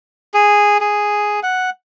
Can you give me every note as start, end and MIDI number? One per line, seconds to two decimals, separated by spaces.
0.34 0.78 68
0.81 1.40 68
1.43 1.70 78